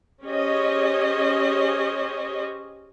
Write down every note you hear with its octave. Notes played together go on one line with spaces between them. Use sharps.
C#4 G4 G#4 C5 C#5 D#5